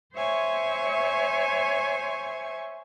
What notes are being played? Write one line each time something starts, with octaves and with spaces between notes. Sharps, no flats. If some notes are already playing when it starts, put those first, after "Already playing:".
C5 C#5 E5 G#5 C#6